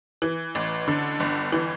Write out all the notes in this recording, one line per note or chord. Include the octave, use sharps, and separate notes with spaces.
E3
A1
D3
G1
E3